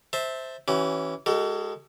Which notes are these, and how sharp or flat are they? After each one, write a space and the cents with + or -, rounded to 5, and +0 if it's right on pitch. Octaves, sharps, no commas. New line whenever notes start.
C5 +0 E5 -15 A5 +10
E3 +0 C#4 +0 F#4 +45
G#3 +0 F#4 +40 A4 +35